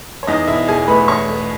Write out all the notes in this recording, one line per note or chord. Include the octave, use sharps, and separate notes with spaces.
C#5
E2 D#4 D#5
E1 E4 E5
E1 G#4 G#5
A3 B4 B5
E2 C#5 C#6
A3